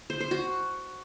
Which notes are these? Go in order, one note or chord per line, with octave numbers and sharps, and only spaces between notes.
C5
C5
F#4